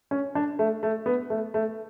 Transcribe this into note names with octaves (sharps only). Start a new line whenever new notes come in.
C#4
D4
A3
A3
B3
A3
A3